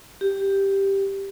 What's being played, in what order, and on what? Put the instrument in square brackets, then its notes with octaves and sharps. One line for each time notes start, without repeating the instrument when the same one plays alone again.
[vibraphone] G4